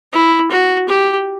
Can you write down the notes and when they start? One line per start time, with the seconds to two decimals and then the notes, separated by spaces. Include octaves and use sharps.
0.13 E4
0.51 F#4
0.88 G4